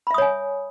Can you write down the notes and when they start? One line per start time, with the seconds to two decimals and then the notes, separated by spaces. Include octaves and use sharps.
0.07 B5
0.11 E5
0.14 D#6
0.18 C#5
0.22 G#5